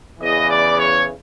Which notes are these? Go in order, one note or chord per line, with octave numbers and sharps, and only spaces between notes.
E2 C#3 E3 D#5
D5
C#5